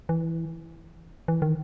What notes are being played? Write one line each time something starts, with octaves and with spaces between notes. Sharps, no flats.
E3
E3
D#3